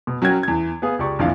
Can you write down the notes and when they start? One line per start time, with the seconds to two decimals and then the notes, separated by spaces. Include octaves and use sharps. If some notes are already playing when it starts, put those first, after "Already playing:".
0.07 B2
0.22 F#3 C#4 F#4 A#4 G5 G#6
0.43 E2 G#6
0.82 B3 G#4 F5
0.99 C#2 G4 D5 C#6
1.19 A#1 F2 D3 E3 F5